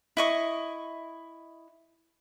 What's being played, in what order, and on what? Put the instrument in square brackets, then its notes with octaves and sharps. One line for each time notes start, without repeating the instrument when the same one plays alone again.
[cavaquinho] E4 D#5 C#6